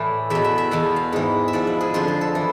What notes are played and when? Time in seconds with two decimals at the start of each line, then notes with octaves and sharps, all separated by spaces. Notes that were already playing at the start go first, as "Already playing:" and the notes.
Already playing: A2 E3 D5
0.30 E2 B2 E5
0.44 E5
0.58 E5
0.71 E2 B2 F5
0.96 F5
1.13 G#2 E3
1.48 E5
1.53 G#2 F3 D5
1.67 B4
1.81 G#4
1.94 F2 D3 F3 F4
2.08 G#4
2.21 A4
2.35 E3